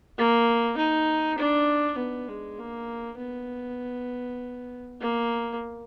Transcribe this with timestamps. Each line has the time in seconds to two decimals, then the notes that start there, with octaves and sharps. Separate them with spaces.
0.18 A#3
0.78 D#4
1.38 D4
1.98 B3
2.28 G#3
2.59 A#3
3.18 B3
5.00 A#3